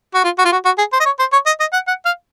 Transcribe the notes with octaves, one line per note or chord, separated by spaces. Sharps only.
F#4
F4
F#4
F4
F#4
F#4
G#4
C5
D#5
C#5
C5
C#5
D#5
D#5
F#5
F#5
F5